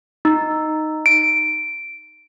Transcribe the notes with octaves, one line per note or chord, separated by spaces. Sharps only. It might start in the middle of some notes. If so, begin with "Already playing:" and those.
D#4
D7